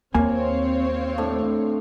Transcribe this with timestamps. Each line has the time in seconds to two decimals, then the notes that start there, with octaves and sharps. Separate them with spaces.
0.15 D#2 A#3 C4 C#5 F5 G#5
1.18 A2 D4